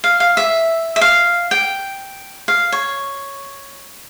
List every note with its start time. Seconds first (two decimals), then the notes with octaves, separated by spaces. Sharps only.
0.04 F5
0.20 F5
0.37 E5
0.96 E5
1.01 F5
1.51 G5
2.48 F5
2.72 C#5